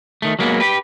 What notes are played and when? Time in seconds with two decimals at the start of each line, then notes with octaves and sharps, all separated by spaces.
0.22 D#3 A3
0.39 F#3 G#3 A#3 B3
0.60 G4 B4